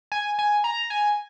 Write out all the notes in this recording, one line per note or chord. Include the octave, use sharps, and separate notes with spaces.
G#5
G#5
A#5
G#5